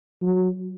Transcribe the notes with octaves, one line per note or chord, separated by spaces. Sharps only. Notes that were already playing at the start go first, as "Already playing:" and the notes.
F#3